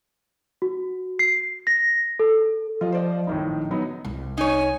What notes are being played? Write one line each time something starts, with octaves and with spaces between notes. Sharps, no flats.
F#4
C7
A#6
A4
F3 F4 G4 D#5
C5 D5 D#5
C2 A2 D#3 D#4
A#1
F#3 B3 D#4
C2
D#4 C#5 G#5